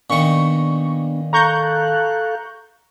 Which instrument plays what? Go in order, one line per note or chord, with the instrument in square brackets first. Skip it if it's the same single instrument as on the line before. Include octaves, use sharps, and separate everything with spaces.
[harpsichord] A#2 D#3 [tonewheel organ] B3 D4 [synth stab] C#6
[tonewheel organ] A4 F5 F#6 [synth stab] A#5 C#6 G6